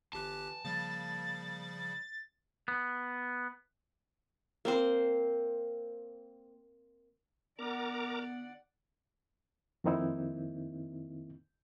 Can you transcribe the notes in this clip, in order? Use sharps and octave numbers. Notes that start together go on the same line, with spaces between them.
G1 E3 G4 A5 F#6
C#3 F3 G3 A#3 A6
B3
A#3 C4 C5
B3 A#4 D5 F#5 A#5 D6
F2 D#3 A#3 C4 D#4 E4